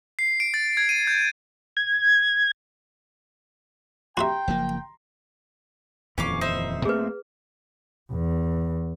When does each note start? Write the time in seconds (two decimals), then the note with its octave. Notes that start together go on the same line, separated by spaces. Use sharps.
0.19 C7
0.40 D7
0.54 A6
0.77 G#6
0.89 D#7
1.07 G6
1.77 G#6
4.17 F#4 G4 E5 G5 A#5 C6
4.48 F#1 F3 A#3
6.18 D#1 F2 E3 C#4 F5 D6
6.41 D#4 C5 E5
6.85 A#2 A3 C4 G#4 B4
8.11 E2